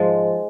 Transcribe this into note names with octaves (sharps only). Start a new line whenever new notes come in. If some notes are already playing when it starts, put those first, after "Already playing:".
Already playing: G#2 F3 G#3